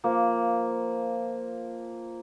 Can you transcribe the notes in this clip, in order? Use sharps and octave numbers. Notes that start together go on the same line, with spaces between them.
F3 A#3